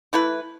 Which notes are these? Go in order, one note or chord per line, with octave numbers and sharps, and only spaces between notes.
E3 A3 E4 B4